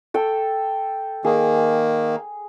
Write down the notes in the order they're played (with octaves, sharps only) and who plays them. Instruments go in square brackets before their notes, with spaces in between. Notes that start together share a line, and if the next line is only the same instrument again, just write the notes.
[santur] A4 G5
[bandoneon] D#3 A#3 [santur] G#4